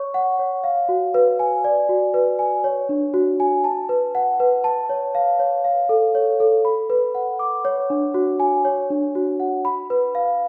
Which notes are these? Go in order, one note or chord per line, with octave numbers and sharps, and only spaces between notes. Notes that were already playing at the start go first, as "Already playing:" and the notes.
Already playing: C#5 C#6
F#5
C#5
F5
F#4
B4
G#5
D5
F#4
B4
G#5
C#5
D4
F#4
G#5
A5
B4
F#5
B4
A5
C#5
F5
C#5
F5
A4
C#5
A4
B5
B4
F#5
D6
C#5
D4
F#4
G#5
C#5
D4
F#4
F#5
B5
B4
F5